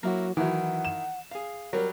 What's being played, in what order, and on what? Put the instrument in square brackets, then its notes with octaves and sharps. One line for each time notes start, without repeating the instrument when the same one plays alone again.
[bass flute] F#3 [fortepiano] A#3 E4 F#4
[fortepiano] D#3 E4 [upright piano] E3 F#3 [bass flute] F#5
[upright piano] E7
[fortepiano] G#4 F5
[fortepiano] F#3 G3 [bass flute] A#4